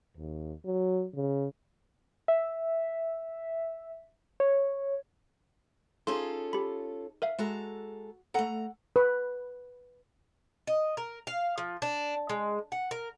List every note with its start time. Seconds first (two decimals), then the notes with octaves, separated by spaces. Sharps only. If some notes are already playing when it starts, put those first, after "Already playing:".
0.17 D#2
0.65 F#3
1.15 C#3
2.28 E5
4.40 C#5
6.07 C#4 D#4 F4 G#4 A4 C5 C6
6.53 G4 B5
7.22 A#4 E5 F5
7.39 G#3 F#4 A4 A#5
8.34 A3 A4 F#5 A#5
8.96 B4
10.67 D#5
10.97 A#4
11.27 F5
11.58 F3
11.82 D4
12.29 G#3
12.72 F#5
12.91 A#4